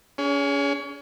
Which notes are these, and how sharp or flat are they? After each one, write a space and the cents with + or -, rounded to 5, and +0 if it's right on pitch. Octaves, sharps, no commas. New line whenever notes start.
C#4 +35 G#4 +0